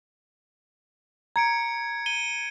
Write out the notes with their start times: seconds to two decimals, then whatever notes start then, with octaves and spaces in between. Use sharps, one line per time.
1.36 A#5 G#6 C#7 D7
2.06 D#7 G7